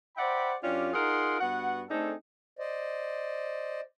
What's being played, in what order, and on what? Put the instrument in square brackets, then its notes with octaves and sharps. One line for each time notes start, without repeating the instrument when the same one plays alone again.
[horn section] C5 D5 E5 F#5 G5 B5
F#2 C#4 D4 F4 G4
D#4 F4 G#4 A#4 F#5 C6
G2 B3 F#4 F#5
A3 C4 D4 D#4 G#4 A4
[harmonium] C5 D5 D#5